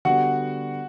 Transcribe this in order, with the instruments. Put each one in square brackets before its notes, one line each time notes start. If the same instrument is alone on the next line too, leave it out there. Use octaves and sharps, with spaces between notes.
[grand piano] D3 G3 B3 [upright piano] F#4 F#5